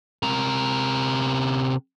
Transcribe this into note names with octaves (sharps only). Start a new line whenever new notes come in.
C3 A#4